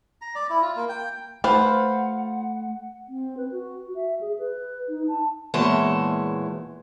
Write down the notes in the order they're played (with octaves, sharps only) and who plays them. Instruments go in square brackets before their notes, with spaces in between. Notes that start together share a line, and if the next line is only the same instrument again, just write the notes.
[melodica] A#5
D5
E4
F4
A#3
G5
[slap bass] A3 [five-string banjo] F4 B4 C5 [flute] F#5
[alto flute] C4
B4
F#4
E5
G#4
B4
D#4
A5
[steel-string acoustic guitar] E2 A#2 E3 G#3 C#5 A5